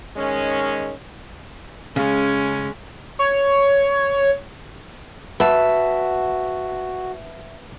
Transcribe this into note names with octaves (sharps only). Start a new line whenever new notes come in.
D#3 G#3 C#4
C#3 G#3 C#4
C#5
F#4 B4 E5 F#5 A5